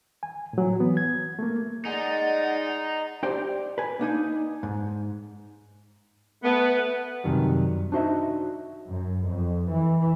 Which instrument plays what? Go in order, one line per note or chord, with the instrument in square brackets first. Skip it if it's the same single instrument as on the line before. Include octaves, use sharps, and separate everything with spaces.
[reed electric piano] G#5
A2 F#3
E3 B3
G#6
A3 A#3
[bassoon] G#3 [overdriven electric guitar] D#4 [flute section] D5 F#5
[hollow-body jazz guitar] D4 G4 C5 D5 G5
B4 G#5
A#3 D4 D#4 G#5
G#2
[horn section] A3 B3
[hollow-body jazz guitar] F#2 C3 D#3 G3
D4 D#4 F#4 C5 D#5 E5
[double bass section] F#2
F2
E3